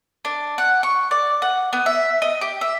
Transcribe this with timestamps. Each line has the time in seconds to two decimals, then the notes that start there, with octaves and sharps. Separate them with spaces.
0.25 D4
0.58 F#5
0.83 C#6
1.11 D5
1.42 F#5
1.73 B3
1.86 E5
2.22 D#5
2.41 G4
2.61 E5